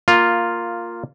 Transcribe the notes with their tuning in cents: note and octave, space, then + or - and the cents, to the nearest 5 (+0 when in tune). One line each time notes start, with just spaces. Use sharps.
A#3 -10 F4 +0